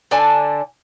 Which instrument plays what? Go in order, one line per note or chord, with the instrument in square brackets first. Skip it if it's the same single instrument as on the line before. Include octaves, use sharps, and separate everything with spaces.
[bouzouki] D3 D4 G#5 A5